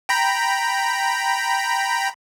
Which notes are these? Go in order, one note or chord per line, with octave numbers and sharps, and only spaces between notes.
G5 A#5 B5